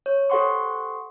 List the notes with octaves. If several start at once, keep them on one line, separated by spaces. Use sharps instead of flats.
C#5
G4 A4 C5 F#5 C6 C#6